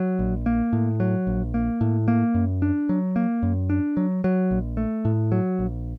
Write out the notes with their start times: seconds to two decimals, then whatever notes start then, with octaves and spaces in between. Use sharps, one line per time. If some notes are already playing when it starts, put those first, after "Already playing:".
Already playing: F#3
0.19 A#1
0.46 A#3
0.73 A2
1.00 F#3
1.27 A#1
1.54 A#3
1.81 A2
2.08 A#3
2.34 F#2
2.62 D4
2.89 F#3
3.16 A#3
3.43 F#2
3.70 D4
3.97 F#3
4.24 F#3
4.51 A#1
4.77 A3
5.05 A2
5.32 F#3
5.59 A#1